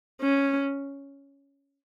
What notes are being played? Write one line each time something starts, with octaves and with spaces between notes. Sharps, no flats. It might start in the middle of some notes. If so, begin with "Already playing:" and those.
C#4